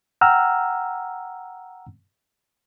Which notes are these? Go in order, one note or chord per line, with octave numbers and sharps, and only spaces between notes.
F#5 G5 A#5 E6 F6